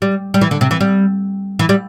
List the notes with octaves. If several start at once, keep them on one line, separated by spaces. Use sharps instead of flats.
G3
G3
E3
D3
C3
E3
G3
E3
G3